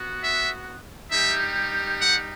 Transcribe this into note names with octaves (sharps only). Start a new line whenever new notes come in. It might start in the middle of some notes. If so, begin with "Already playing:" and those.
Already playing: B3 F#4
E5
G3 D#4 G4 E5
F#5